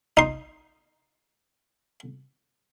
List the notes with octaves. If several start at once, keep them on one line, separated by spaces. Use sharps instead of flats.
D#4 C6